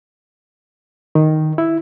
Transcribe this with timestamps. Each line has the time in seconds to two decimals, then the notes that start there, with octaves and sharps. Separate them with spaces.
1.15 D#3
1.58 E4